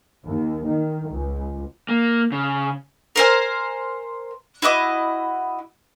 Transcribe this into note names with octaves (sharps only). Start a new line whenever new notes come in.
D#2
D#3
C#2
A#3
C#3
A#4 C5 G#5
E4 F#4 D#5 D6